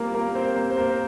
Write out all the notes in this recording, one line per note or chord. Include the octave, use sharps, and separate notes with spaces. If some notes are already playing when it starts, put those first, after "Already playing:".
Already playing: G3 A#3 C4 F4 G4 A#4
A#3 A#4
C4 C5
A#3 A#4
C5
A#3 A#4